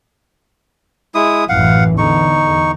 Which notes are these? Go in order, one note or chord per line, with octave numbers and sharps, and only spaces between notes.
G#3 E4 D#6
A1 F#2 E3 F5 F#5
E2 D3 D#4 C#6